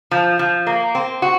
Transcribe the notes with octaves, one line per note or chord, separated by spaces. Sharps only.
F3
F3
A#3
C4
F#4